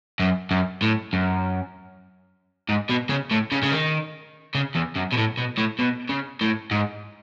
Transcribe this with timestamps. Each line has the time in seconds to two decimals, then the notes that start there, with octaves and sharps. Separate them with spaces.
0.20 F#2
0.51 F#2
0.82 A2
1.13 F#2
2.69 G#2
2.89 B2
3.09 C#3
3.31 A2
3.52 C#3
3.63 C#3
3.72 D#3
4.55 C#3
4.75 E2
4.96 F#2
5.12 B2
5.17 A2
5.37 B2
5.58 A2
5.79 B2
6.09 C#3
6.41 A2
6.71 G#2